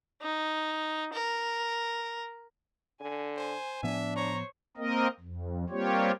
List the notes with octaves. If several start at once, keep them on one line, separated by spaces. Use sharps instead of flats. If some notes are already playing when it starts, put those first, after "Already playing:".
D#4
A#4
D3 G#5
C5 G#5
A2 F3 B3 D4 E5
C5 C#5 A#5
A#3 C4 A#4 D#5
F2
G3 A#3 C4 F4 G4 C#5